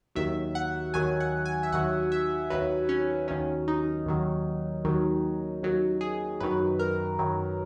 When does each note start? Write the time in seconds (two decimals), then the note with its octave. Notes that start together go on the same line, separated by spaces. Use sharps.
0.15 D#2 D#3 F#3 E5
0.55 F#5
0.94 D#2 D#3 F#3 G#5
1.21 F#5
1.46 G#5
1.63 E5
1.72 D#2 D#3 F#3 F#5
2.12 E5
2.50 D#2 D#3 F#3 B4
2.89 C#4
3.28 D#2 D#3 F#3 C#4
3.68 D#4
4.06 D#2 D#3 F#3
4.85 D#2 D#3 F#3
5.62 D#2 D#3 F#3
6.01 G#4
6.40 F#2 D#3 F#3 B4
6.79 A#4
7.19 F#2 D#3 F#3